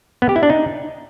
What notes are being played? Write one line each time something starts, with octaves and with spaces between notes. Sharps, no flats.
B3
G4
E4
D4
D#4